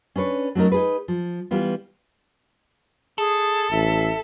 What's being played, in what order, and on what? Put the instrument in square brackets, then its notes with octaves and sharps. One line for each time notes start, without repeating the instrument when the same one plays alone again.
[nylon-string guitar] C#4 D4 B4 C#5
F#3 A3 C#4 D#4 A#4
D#4 G#4 B4
F3
E3 G3 B3 F4
[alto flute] G#4 [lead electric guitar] A4
[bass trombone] A1 [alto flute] E5